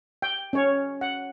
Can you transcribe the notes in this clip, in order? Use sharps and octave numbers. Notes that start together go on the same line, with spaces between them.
G5
C#4 C#5
F#5